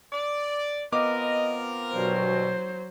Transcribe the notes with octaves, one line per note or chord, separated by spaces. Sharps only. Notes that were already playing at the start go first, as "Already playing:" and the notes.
D5
B3 C4 F4 A#4 D#5 D6
G2 B2 F#3 C5